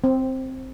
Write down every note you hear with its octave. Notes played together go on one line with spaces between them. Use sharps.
C4